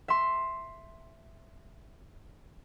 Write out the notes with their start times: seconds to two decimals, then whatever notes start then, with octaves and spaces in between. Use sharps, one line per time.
0.08 E5 C6